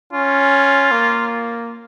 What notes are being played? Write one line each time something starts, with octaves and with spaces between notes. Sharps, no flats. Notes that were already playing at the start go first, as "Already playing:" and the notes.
C#4 F4
A#3